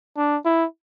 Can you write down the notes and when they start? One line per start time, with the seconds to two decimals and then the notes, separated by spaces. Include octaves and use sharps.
0.17 D4
0.45 E4